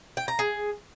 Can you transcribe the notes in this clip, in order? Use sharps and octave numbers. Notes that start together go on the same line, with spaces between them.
G5
A#5
G#4